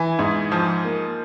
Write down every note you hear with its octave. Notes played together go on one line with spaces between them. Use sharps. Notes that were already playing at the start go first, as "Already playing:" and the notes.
Already playing: E3 G#5
G#2
F3
A#3